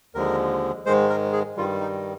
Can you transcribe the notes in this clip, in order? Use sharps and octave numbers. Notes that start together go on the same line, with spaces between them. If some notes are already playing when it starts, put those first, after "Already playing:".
D#2 D3 F3 G#3 A#4
G#2 D#3 G#3 C5
A#4
G#4
G2 D#3 G3 F4
D#4